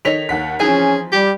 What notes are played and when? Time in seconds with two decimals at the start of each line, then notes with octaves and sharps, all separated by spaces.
0.05 D#3 A4 C#5 D#5 B6 F7
0.29 D#2 F#5 B6
0.60 E3 F3 C4 C#4 D#4 G#4 G#5
1.12 G3 G4